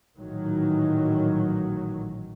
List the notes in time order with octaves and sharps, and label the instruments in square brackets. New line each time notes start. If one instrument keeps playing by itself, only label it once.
[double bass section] A1 A#2 D#3 E3 F#3